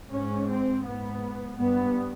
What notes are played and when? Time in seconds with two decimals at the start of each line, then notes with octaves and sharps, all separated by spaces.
0.12 G#2 C#4
0.49 C4
0.85 G#2 B3
1.57 G2 B3